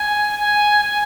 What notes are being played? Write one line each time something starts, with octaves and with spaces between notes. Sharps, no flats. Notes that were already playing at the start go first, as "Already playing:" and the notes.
Already playing: G#5
G#5
G#5